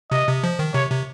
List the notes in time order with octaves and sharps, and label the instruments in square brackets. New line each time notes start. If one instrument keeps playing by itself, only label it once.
[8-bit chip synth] C3 [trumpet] D#5
[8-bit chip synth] C3
F3
D#3
[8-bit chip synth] C3 [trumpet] C#5
[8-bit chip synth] C3